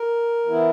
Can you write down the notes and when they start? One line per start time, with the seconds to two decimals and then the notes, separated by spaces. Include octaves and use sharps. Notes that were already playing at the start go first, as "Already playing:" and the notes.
Already playing: A#4
0.46 E3 B3 E4